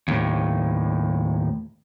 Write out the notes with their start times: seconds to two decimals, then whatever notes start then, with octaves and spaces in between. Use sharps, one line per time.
0.08 D#2 A2